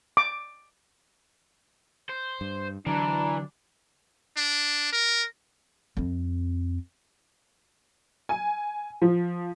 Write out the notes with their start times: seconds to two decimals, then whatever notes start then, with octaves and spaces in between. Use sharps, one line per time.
0.17 D6
2.09 C5
2.41 G2
2.87 D3 E3 F#3 D4 A#5
4.37 D4
4.93 A#4
5.97 F2 C4
8.29 G#5
9.02 F3